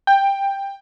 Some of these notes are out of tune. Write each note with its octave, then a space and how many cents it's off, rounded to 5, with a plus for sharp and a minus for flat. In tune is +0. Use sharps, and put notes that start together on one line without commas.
G5 +10